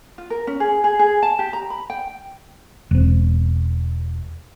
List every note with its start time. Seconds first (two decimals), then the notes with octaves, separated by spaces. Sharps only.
0.18 F4
0.30 A#4
0.47 C#4
0.60 G#4
0.84 G#4
0.99 G#4
1.23 A5
1.39 G4
1.53 A#5
1.70 B5
1.90 G5
2.91 E1 C4